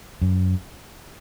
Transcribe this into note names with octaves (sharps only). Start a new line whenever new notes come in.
F#2